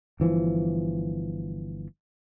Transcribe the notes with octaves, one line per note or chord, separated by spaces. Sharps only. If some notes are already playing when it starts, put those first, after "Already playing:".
G1 E3 F3